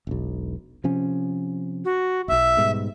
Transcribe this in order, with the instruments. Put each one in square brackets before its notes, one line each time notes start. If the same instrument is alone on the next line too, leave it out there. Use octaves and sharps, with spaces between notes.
[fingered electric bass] E1 B1
C3 F3 C#4
[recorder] F#4
[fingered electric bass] D#1 B1 [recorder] E5
[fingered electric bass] G#2 B2 G3